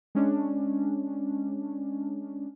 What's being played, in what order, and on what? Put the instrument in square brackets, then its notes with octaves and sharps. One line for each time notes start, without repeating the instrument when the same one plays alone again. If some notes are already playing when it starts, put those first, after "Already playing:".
[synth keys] G#3 C#4 D4